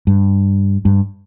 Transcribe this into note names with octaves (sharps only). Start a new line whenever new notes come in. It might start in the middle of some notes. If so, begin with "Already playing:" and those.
G2
G2